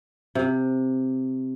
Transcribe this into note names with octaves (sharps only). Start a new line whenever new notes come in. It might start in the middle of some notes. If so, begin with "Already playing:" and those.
C3